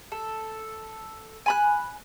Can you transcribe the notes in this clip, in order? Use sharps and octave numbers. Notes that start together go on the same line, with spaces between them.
A4
G#5 B5 F#6